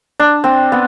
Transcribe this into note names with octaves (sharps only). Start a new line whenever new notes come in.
D4
C4
B3